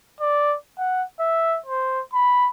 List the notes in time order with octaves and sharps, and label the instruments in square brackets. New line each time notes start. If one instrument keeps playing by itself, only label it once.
[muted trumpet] D5
F#5
E5
C5
B5